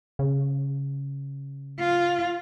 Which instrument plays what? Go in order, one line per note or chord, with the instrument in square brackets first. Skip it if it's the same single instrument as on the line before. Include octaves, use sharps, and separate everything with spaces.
[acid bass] C#3
[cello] F4